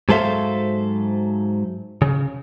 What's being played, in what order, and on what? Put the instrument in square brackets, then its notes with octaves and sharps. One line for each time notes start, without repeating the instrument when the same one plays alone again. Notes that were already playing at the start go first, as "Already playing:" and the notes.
[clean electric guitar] G#2 F#3 A4 C5 E5 F5
C#3